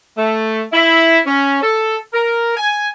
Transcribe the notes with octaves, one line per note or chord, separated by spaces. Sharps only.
A3
E4
C#4
A4
A#4
G#5